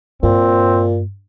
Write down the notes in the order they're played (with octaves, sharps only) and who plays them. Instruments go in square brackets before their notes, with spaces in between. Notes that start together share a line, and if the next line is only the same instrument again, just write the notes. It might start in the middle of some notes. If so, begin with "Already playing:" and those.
[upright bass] G2 [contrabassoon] A#2 [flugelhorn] C4